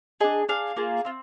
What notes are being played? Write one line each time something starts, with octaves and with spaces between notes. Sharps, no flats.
D4 G#4 D#5
D4 G#4 F5
A#3 F4 G#4
C4 F4